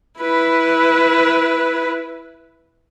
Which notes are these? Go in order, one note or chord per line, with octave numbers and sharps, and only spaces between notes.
E4 B4